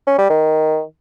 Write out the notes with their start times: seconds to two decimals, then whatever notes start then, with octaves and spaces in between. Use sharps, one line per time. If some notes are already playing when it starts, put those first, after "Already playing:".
0.07 C#4
0.18 G3
0.29 D#3